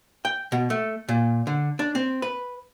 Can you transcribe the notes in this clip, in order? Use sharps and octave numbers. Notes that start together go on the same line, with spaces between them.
G5
B2
A3
A#2
D3
D4
C4
B4